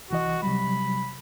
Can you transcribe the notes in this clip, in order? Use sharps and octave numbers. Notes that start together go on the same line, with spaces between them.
C2 E3 F#4 D#5
C3 F#3 G3 B5